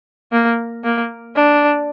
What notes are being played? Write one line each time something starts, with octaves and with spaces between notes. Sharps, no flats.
A#3
A#3
D4